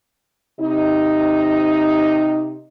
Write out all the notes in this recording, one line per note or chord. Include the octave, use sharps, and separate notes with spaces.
C3 D#4